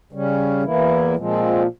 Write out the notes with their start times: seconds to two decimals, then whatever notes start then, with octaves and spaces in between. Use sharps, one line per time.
0.12 C#3 G3 C#4
0.64 E2 E3 A#3 E4
1.16 A#2 F3 G#3 C4